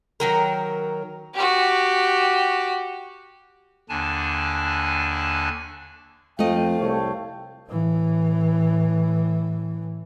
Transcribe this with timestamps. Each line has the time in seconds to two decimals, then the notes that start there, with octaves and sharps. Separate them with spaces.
0.20 D#3 F#3 A#4
1.34 F#4 G4
3.89 D#2 D3 D4 G#5 A5
6.39 F2 A3 D#5 F5 G5
6.80 C2 A4 C#5 G5
7.69 A2 E3